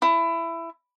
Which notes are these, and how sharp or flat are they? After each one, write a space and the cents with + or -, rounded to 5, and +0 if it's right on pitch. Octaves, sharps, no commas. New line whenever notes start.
E4 +15